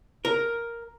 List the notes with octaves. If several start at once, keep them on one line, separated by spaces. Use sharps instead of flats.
A#4